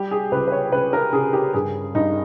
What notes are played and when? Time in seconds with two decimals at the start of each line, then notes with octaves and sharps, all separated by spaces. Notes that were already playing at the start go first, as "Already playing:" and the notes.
Already playing: G3 G4
0.11 G#4
0.31 C#2 B4
0.48 B4
0.52 C#5
0.72 C#2 B4
0.93 A#4
1.13 C#3 G#4
1.33 G4
1.54 G2 G#4
1.95 G2 D#4